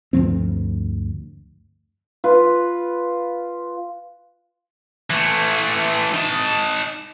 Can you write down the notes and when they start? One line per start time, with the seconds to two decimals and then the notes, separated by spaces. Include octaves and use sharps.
0.13 D2 G2 F3 C4
2.24 F4 B4
5.10 E3 A3
6.14 D#4 A5